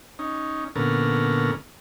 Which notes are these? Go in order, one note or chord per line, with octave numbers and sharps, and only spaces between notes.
C#4 D#4
A#2 D3 B3 C#4 A4 A#4